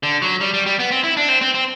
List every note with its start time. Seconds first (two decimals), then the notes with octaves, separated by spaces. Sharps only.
0.03 D3
0.22 F#3
0.41 G3
0.54 G3
0.66 G3
0.79 B3
0.91 C4
1.04 E4
1.17 D4
1.29 C4
1.41 C4
1.54 C4